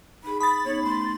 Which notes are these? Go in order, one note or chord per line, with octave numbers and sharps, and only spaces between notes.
D#4 G#4 B5
B5 D#6 A6
B3 C#4 D#4 C#5
A3 C6